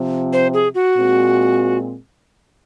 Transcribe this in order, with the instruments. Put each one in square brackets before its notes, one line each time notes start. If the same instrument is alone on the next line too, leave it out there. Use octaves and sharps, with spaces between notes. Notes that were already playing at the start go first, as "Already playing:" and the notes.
Already playing: [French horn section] C3 F3 C4
[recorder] C5
G#4
F#4
[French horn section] A#2 G#3 C4